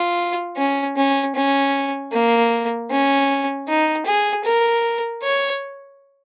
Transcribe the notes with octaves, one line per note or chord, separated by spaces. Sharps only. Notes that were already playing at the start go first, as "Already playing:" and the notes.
Already playing: F4
C#4
C#4
C#4
A#3
C#4
D#4
G#4
A#4
C#5